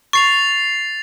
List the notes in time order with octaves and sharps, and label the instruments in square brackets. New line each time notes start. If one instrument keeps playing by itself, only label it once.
[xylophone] C#6 [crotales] A6 C7 F7